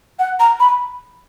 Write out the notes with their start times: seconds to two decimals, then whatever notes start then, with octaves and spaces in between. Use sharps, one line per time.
0.19 F#5
0.40 A#5
0.60 B5